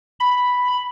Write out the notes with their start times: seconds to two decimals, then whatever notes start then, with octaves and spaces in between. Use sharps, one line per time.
0.20 B5